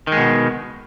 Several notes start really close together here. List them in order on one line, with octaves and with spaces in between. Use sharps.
D#3 G#3 B2